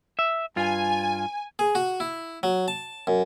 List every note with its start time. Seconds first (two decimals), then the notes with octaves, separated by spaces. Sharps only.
0.19 E5
0.56 G2 F4 G#5
1.59 G#4
1.75 F#4
2.00 E4
2.43 F#3
2.68 A5
3.07 F#2